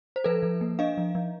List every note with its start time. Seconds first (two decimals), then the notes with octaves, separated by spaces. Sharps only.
0.16 C5
0.24 F3 A4 B4
0.43 F3
0.61 A#3
0.79 D4 D#5 F5
0.98 F3
1.15 F3